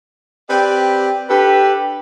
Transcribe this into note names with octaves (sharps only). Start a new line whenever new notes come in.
C4 G4 B4 D5
D4 G4 A4 B4